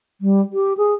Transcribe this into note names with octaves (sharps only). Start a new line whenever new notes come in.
G3
G4
G#4